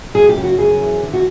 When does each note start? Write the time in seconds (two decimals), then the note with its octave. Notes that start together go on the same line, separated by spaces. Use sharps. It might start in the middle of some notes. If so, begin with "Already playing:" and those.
0.14 F#2 G#4
0.29 G4
0.36 C#3
0.44 F#4
0.58 F#2 G#4
0.80 E3
1.02 D3
1.13 F#4